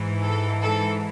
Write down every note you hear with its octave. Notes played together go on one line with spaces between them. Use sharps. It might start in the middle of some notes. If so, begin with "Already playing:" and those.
Already playing: G#2 E3
A4
A4